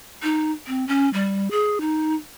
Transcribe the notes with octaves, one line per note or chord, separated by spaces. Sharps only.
D#4
C4
C#4
G3
G#4
D#4